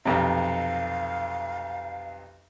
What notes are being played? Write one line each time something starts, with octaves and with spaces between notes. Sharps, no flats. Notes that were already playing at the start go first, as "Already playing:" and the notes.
B1 F2 C3 F5